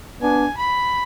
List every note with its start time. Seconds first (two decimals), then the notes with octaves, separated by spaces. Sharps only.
0.21 B3 D4 G#5
0.57 B5